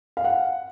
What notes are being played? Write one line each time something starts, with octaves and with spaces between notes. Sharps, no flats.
F5
F#5